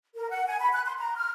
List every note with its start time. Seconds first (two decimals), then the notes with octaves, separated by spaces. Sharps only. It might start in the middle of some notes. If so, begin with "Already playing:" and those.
0.15 A#4
0.30 F#5
0.47 G#5
0.60 B5
0.73 F#6
0.85 C6
0.98 A#5
1.16 F6